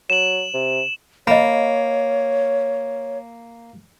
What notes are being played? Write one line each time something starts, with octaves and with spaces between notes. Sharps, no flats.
F#3 E7 F#7
C3
A#3 C#5 D#5 B5